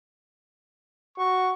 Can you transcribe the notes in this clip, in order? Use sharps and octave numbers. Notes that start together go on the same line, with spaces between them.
F#4 C#6